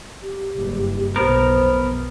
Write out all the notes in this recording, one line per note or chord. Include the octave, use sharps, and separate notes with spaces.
G4
F#1 G2
F1 B1 B3 A#4 C5